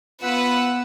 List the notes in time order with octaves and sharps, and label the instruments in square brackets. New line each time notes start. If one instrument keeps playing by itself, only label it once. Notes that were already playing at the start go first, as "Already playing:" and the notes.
[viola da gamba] B3 [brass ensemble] F4 B4 [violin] F#5 E6